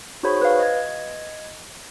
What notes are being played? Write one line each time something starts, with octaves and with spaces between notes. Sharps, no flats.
D#4 F#4 G#4 C5 C#5 B5
B4 F5
D#5 G#6